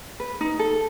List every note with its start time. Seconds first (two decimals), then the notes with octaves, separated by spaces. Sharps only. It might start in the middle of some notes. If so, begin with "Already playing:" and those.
0.20 B4
0.41 D#4
0.59 A4